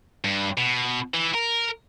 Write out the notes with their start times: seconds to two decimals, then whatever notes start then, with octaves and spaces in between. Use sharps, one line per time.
0.24 G2
0.58 B2
1.14 E3
1.34 A#4